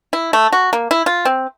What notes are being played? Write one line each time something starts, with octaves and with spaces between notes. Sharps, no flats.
E4
A3
F#4
A#3
E4
F4
C4